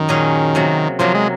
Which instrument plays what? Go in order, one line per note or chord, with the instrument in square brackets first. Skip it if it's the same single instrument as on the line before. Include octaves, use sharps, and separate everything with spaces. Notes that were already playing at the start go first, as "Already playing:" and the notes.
Already playing: [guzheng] F#2 [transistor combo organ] D#3
[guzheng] A#2 F#3 C#4 G#4
C3 F#3 A#3
[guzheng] C3 F#3 A#3 [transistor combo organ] F3
[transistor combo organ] G#3